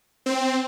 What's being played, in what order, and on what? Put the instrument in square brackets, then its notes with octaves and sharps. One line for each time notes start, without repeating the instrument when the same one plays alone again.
[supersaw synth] C4